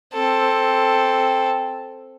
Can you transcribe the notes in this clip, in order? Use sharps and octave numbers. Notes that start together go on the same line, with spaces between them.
C4 A4